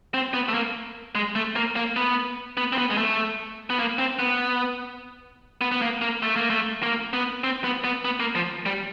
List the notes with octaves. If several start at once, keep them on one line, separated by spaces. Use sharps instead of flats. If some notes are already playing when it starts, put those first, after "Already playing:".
C4
B3
A3
A#3
G#3
A3
A#3
A#3
B3
B3
C4
B3
G#3
A3
B3
A#3
C4
B3
B3
B3
A#3
A#3
A3
A#3
A3
A#3
B3
C4
B3
B3
B3
A#3
F3
G3